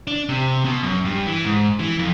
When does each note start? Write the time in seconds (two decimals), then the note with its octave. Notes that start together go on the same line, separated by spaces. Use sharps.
0.07 D4
0.29 C3
0.65 B2
0.83 F#2
1.05 G2
1.27 E3
1.45 G#2
1.80 E3
1.99 F2